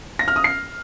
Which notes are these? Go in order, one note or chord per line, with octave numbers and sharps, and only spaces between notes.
A#6
F6
D#6
C7